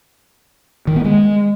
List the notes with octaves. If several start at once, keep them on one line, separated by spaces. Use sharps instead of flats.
D#3
B3
G#3